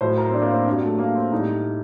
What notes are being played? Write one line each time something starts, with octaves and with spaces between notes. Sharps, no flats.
A2 F#3 C5
A#4
C4
D4
A#3
C4
G2 F#3
A3
A#3
C4
A2 G3 D#4